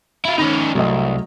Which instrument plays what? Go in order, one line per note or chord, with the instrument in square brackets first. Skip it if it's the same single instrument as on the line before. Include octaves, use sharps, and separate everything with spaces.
[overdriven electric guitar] E4 F4
[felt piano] D#3 B5 A#6 [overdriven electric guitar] C#4 D#4
[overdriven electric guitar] C2 [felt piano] F#3 A3 D#5